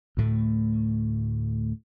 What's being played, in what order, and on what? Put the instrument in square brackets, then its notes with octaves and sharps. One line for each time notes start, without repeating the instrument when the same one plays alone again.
[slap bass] D2 A2 A3